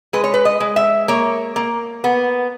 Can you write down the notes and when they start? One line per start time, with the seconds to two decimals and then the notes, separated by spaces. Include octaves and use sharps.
0.13 G#3 B4
0.24 C#5
0.34 B4
0.45 D#5
0.60 G#3
0.76 E5
1.08 A#3 C#5
1.56 A#3
2.04 B3